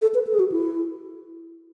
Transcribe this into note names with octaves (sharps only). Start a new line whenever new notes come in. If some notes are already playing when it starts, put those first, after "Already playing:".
A4
B4
A4
G#4
F#4
E4